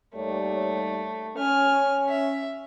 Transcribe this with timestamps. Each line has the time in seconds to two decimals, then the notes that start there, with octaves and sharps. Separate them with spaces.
0.15 D#2 G3 A3 C#5
1.38 C#4 G#5 F6
2.08 E5